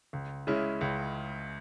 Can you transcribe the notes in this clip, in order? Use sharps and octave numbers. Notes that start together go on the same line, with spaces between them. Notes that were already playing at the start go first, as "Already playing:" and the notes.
C#2
C#3 G#3 C#4 E4
C#2